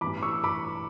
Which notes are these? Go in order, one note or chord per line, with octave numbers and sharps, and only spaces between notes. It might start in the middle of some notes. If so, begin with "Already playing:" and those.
A1 G2 E3 B5 D6
C#6 E6
B5 D6